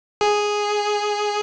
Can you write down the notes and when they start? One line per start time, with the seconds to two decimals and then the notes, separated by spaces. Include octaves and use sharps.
0.21 G#4